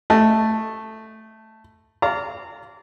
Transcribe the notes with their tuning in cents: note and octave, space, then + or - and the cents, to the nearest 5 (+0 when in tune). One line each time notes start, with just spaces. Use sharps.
A3 +0 D#5 +0
D5 -30 F5 -5 A#5 -30